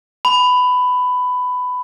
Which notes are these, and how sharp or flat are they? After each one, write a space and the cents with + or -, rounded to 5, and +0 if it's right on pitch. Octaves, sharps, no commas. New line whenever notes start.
B5 +15